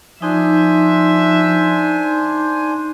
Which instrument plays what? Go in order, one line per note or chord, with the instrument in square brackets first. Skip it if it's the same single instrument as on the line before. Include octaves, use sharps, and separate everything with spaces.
[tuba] F3 [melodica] D4 C5 G#5 [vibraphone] D#4 [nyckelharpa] E5